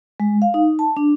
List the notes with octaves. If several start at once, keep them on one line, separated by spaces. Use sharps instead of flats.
G#3
F5
D#4
A5
D4